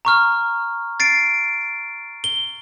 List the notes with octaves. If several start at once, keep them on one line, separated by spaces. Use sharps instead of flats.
A#5 C#6 F6
A6 C7 D7
G7